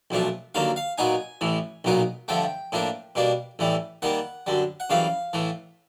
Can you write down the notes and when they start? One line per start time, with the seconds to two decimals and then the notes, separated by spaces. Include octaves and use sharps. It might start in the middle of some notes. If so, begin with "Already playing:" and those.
0.10 B1 A#2 F3 A3 D4
0.54 D#2 D3 F#3 A#3 F5
0.76 F5
0.98 A#2 F#3 B3 D#4 G#5
1.41 A1 A2 E3
1.84 B1 A#2 F#3 B3 D#4
2.28 G2 D3 F3 A3 G5
2.72 A2 F3 A#3 D4
3.15 B2 G3 A#3 D4
3.59 A1 A2 E3 G3
4.02 D#2 D#3 G3 A#3 F#5
4.47 F#2 D3 G3
4.80 F#5
4.90 F#2 C#3 E3 G3 F5
5.33 A2 E3 A3